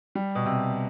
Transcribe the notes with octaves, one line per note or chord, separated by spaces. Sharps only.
G3
B2
C3